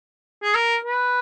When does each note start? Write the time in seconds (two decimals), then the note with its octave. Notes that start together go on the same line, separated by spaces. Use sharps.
0.43 G#4
0.55 A#4
0.85 B4